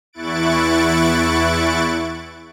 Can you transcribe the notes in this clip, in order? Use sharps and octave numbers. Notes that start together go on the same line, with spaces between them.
E2 E4 C#6 F#6 A6 D7